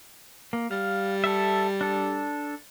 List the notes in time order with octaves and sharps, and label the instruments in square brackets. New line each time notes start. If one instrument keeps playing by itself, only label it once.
[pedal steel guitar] A#3
[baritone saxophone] G3 [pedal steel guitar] F5
[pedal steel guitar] A4 E5
D4 A4